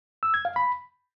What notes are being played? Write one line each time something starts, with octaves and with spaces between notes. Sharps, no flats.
E6
G#6
F5
B5